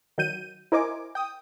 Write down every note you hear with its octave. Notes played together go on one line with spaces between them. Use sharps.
D#3 F#3 G6 D#7
E4 A#4 C5 D#5 G#5 D6
G5 D#6